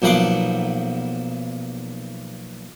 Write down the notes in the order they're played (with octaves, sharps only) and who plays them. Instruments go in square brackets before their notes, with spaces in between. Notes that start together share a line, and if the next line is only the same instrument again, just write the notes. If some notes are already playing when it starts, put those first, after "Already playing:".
[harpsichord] B1 A#2 F3 F#5 C6 D6